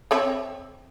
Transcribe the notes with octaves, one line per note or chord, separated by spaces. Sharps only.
C4 C#5 E5